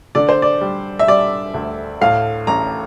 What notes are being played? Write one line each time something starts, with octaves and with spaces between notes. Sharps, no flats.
D3 D5
C5
D5
G3
E5
G3 D5
D2
A2 F5
A1 A#5